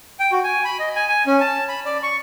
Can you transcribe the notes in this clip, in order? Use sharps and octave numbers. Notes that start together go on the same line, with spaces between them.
G5
F#4
G#5
B5
D#5
G#5
G#5
C#4
A5
B5
D5
C#6